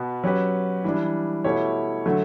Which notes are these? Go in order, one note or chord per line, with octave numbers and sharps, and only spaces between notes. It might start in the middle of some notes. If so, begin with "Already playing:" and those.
Already playing: B2 B3
F#3 C#4 G4 B4
E3 G3 D4
B2 A3 E4 G4 C#5
D3 F#3 A3